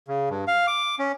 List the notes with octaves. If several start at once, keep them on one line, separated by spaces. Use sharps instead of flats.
C#3
G2
F5
D6
C#4